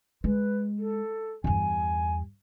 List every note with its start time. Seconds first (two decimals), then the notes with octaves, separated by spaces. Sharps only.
0.24 G#3 B4
0.79 A4
1.44 E2 G2 G#5